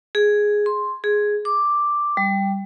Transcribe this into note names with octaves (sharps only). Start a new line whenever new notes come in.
G#4
C6
G#4
D6
G3